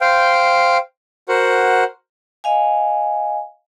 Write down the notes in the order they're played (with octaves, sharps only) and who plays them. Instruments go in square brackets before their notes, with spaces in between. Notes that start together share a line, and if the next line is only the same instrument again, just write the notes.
[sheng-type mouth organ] C5 F5 G5
F#4 A#4 C5 F#5
[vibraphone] D#5 F5 G#5